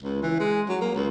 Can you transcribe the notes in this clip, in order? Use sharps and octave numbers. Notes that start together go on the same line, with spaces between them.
C#2
E3
G#3
F#3
A#3
C#2